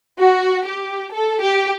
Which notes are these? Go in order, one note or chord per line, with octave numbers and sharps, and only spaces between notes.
F#4
G4
A4
G4